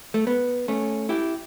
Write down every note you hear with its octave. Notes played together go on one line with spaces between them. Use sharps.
A3
B3
A3 C#4
E4 G4